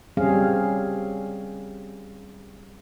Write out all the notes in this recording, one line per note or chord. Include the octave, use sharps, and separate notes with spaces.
G3 C4 C#4 G#4 F5